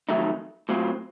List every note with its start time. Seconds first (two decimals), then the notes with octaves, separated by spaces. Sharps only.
0.09 F2 D#3 F#3 A3 D#4
0.69 A2 F#3 C4 F4